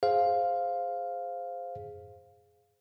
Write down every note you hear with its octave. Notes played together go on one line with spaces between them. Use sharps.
G#4 C5 F5